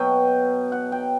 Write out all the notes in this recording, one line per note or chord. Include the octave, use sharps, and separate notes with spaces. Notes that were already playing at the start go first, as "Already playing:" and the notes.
Already playing: B2 F#3 G5
F#5
G5